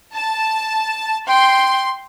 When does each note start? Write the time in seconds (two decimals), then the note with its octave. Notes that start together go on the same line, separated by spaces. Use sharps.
0.15 A5
1.27 G5 C6